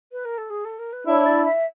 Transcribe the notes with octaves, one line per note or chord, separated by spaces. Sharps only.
B4
A#4
A4
G#4
A4
A#4
B4
D4 E4 C#5
D5
E5